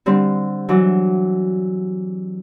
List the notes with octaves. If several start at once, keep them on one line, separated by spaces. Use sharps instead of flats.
D3 G3 C4
E3 F#3